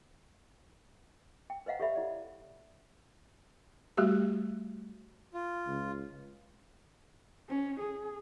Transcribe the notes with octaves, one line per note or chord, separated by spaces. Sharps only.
G5
B4 C5 D#5 F5 F#5 A#5
G4 A4 C#5 D5 E5 B5
E4 D5
G3 A3 F#4 G4
F4
C#2
C#4
G#4